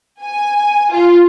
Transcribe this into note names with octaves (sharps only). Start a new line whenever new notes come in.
G#5
F4